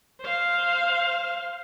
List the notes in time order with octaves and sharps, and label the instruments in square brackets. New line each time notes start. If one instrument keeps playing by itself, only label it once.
[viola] C5 F5